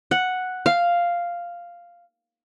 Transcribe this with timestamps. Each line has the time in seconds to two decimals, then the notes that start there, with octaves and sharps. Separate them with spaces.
0.11 F#5
0.66 F5